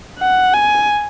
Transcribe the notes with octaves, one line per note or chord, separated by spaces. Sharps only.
F#5
G#5